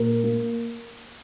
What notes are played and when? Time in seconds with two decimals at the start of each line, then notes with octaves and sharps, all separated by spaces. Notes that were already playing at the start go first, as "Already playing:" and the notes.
Already playing: A#2 A#4
0.23 A#3